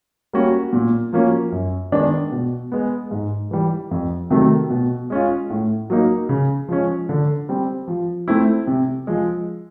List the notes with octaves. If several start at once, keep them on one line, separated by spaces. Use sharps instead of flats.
G3 A#3 C#4 F#4
A#2
F3 A#3 C#4 F#4
F#2
D#3 G#3 B3 D4
B2
G#3 B3
G#2
E3 G3
F2
C3 D#3 F#3 A3
B2
G#3 C#4 F4
A2
F#3 A#3 D#4
C#3
F3 G#3 C#4
D3
G3 C4
F3
A3 C4 E4
C3
F3 G#3